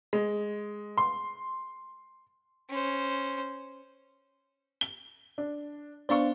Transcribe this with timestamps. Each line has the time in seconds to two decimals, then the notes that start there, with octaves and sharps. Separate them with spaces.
0.13 G#3
0.98 C6
2.69 C#4 C5
4.81 G7
5.38 D4
6.09 B3 D4 C5 D5 F5 C#6